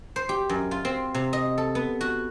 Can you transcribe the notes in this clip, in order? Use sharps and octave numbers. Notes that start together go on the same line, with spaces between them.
C5
G4
F#2
F4
C4
C3
D#5
A4
B3
F#4